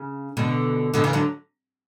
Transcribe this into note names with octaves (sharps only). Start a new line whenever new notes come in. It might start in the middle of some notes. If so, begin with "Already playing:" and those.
Already playing: C#3
B2 D3
B2 D3
C#3 E3
D3 F#3